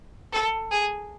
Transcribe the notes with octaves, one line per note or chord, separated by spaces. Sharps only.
A4
G#4